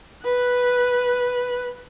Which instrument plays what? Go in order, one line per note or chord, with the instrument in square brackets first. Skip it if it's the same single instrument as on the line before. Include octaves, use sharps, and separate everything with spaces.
[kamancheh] B4 F#6